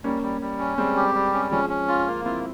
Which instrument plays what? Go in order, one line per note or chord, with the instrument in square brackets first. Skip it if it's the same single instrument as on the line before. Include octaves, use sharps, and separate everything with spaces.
[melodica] G3 [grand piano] A#3 C#4
[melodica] G3
G3
C#4
[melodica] G3 [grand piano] G#3 C4
[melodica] G4
G3
C#4
[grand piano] F3 G#3 [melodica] C#4
[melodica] C#4
F4
A#3
[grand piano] C4 E4 [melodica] F4